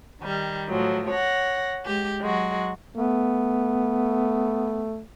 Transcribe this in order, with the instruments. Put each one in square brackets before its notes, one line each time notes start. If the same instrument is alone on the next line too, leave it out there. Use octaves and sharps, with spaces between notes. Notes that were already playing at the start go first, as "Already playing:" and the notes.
[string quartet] D#3 G3
A2 F3 F#3
C#5 F#5 A#6
G#3 G4
F#3 G#3 F#4
[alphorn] A3 [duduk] B3